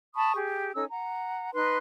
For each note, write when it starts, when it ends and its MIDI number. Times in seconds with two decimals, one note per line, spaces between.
0.14 0.34 81
0.14 0.34 83
0.14 0.34 85
0.14 0.34 87
0.35 0.71 67
0.35 0.71 68
0.74 0.84 61
0.74 0.84 63
0.74 0.84 69
0.74 0.84 88
0.89 1.50 78
0.89 1.50 82
1.53 1.77 63
1.53 1.77 71
1.53 1.77 84
1.53 1.77 90